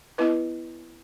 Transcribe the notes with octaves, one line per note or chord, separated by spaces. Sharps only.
B3 E4 B4 D#5